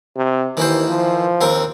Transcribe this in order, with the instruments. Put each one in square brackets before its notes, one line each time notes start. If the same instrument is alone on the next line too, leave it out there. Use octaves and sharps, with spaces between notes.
[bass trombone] C3
[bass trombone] D#2 [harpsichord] D#3 E3 C5
[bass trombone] F3
[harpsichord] D#2 C4 A#4